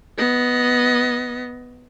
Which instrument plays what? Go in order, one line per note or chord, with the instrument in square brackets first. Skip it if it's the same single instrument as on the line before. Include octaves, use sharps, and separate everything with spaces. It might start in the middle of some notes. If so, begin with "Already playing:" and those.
[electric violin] B3 D#5